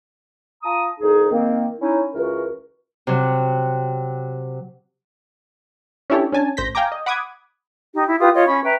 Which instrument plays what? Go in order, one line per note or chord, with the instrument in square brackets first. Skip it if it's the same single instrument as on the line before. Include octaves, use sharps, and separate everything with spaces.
[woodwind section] F4 A5 A#5 D#6
C2 F2 D#4 G#4
D#3 A#3 C4
C#4 D#4 E4
C#2 E3 F#4 A#4
[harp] C3 F#3
[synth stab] C#4 D4 E4 G4 A4 C#5
C#4 D4 G#5 A5
A1 C5 G6 A#6 B6
F5 G5 G#5 A#5 D6
D#5
F#5 B5 D6 D#6 G#6
[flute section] D#4 G4
E4
F4 G4 B4 D#6
F4 C#5 D#5
C#4 B5 C#6
B4 E5 G5 A#5